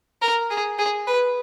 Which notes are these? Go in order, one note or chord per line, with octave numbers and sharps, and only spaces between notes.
A#4
G#4
G#4
B4